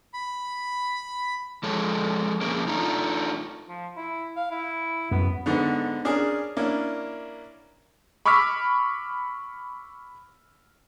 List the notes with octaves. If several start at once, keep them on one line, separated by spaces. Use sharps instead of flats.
B5
F3 G#3 A4 C#5
F3 A#3 C#4 G#4 A#4
A3 D4 D#4 F4
F3
E4
F5
E4
F#2 B3
G#2 D3 B3
C#4 D4 G#4 A#4
A#3 C#4 D4 E4
B5 C#6 D6 E6 F6 B6